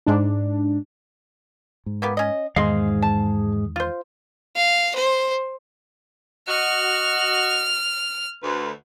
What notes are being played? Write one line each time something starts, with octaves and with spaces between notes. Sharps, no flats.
G#2 D4
G#2
A#3 B3 G4
C#4 D#5
E2 G#2 D#3 G#3 G#4 D#5 F5 C6
A5
F4 C5
F5
C5
F#4 D#5 F6
D2 B4